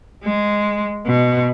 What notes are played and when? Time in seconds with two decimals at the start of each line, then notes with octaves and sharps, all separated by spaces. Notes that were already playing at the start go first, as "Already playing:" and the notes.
0.24 G#3
1.06 B2